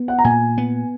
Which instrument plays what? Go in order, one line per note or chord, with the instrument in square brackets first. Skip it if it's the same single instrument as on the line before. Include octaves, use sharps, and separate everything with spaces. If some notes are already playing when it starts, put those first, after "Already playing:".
Already playing: [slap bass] B3
[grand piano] F#5
A#5
[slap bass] A#2 [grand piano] G#5
[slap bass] B3